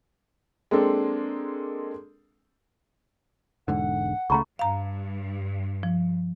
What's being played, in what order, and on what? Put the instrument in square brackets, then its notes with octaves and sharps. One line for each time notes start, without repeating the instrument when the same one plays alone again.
[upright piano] G#3 A#3 C4 D4 A4
[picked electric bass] E1 G#2 D3 [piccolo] F#5
[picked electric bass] C#2 C#3 A3 [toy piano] A#5 B5 C#6
[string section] G2 [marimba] F5 A#5
[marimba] F3